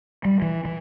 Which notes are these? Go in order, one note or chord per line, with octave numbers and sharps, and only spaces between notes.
G3
E3
E3